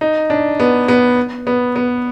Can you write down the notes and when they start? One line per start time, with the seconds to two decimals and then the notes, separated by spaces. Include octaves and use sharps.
0.01 D#4
0.30 D4
0.60 B3
0.88 B3
1.47 B3
1.76 B3